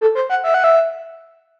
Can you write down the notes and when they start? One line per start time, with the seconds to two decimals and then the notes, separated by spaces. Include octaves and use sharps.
0.01 A4
0.15 C5
0.30 F#5
0.44 E5
0.54 F#5
0.64 E5